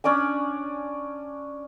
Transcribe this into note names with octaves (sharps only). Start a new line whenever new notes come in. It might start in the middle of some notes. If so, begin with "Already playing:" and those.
C#4 D4 D5 G#5